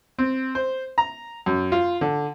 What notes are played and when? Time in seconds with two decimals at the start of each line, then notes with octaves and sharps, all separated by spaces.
0.19 C4
0.55 C5
0.98 A#5
1.46 F#2
1.72 F4
2.01 D3